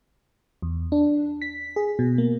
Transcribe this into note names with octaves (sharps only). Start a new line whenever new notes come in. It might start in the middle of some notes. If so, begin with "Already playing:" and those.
E2
D4
B6
G#4
B2
A#3